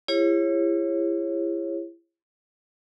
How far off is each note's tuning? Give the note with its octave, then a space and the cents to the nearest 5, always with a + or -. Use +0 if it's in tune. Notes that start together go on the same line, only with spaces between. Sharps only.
E4 +35 G#4 -45 C#5 -25